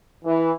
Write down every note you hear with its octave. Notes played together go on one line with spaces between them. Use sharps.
E3